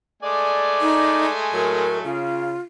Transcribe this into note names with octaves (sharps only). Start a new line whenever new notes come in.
G#3 A3 D5 G#5
D#4
A2 F#3 A#4
C#3 F4